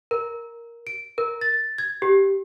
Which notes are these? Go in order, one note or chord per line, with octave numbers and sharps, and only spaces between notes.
A#4
D7
A#4
A6
G#6
G4